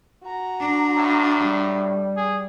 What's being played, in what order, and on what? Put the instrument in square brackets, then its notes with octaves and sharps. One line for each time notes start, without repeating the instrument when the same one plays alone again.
[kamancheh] F#4 A#5
[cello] D4
[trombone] A2
[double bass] G3
[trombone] G#4